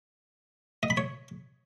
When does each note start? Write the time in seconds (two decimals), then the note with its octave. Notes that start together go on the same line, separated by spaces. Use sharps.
0.83 D#5
0.90 B5
0.97 C#5